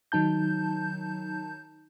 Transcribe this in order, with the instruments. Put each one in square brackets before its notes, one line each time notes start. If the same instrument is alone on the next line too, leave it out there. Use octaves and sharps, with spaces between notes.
[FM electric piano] D#3 F#3 D#4 A5 G6